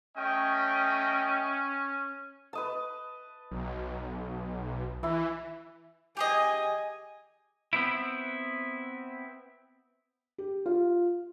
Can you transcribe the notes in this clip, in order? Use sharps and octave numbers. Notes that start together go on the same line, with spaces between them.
A3 C#4 D#5 G5
B4 D#5 A5
B1
E3 E4 E5
G4 G#4 D#5 G#5
B3 C4 E4
G4
F4